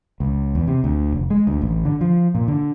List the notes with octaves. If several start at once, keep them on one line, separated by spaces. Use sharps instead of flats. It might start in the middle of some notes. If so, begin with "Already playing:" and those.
C#2
E2
C3
D2
F1
G#3
D2
A1
D3
F3
A#2
D3